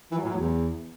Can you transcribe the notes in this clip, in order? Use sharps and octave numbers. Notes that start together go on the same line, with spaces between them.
E3
F#3
A2
F#3
E2